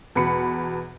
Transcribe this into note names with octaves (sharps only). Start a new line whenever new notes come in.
E2 B2 B5 C#7